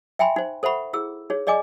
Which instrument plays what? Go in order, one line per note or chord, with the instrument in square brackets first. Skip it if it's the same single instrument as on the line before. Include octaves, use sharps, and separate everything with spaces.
[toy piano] E5 G5 G#5 B5 C6
D#4 C5
A4 C5 E5 F#5 B5 C#6
E4 G#4 E6
D#4 G#4 C#5
G#4 D5 D#5 G#5 D6